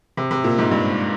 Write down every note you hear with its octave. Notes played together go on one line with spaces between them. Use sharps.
C3
C3
A#2
G#2
G2